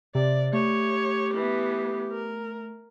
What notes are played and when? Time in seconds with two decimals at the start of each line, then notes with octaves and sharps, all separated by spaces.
0.15 C3 D5
0.53 A3 G4 C#5
1.34 E3 B3
2.11 A#4